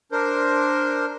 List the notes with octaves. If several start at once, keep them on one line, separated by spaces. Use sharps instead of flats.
D4 A#4 C5